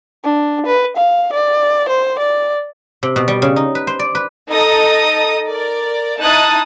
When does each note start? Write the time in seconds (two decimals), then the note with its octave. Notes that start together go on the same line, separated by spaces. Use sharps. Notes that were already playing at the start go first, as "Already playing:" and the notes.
0.24 D4
0.66 B4
0.97 F5
1.33 D5
1.89 C5
2.19 D5
3.03 C3
3.16 B2
3.28 G3
3.42 C#3
3.56 D#4
3.75 B4
3.87 C5
3.99 D5
4.15 B4
4.49 D#4 A4 D#5 D#6
5.48 A#4 D5
6.19 D#4 E4 A5 D#6 F#6